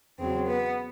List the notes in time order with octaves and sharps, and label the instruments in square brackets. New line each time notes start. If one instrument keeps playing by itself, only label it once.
[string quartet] E2 C#3 F#3 C4
B3